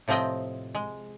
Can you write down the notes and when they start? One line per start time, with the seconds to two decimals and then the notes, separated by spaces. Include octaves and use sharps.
0.08 A2 C3 F3 C4 D#5 G5
0.75 G#3